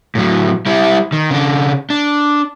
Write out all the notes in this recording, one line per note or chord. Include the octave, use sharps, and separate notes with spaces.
A2 F#3
G3 E4
D#3
C#3 D4
D4